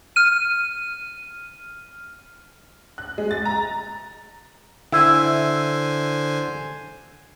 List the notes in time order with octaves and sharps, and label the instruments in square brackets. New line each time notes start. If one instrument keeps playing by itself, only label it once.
[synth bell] F6 D#7
[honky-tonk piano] F#6
G#3
A6
A#5
[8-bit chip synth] D3 C5 G#5 [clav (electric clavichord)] E4